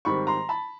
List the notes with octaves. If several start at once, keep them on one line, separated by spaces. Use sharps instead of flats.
G#2 D#3 G3 C4 B5 C#6
A#5 C6
A5 B5